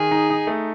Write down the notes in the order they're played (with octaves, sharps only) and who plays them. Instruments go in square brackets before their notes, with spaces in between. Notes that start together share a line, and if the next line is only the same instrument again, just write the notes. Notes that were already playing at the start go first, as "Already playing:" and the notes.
Already playing: [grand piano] D#3 [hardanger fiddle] G#4
[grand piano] D#4
D#4
A3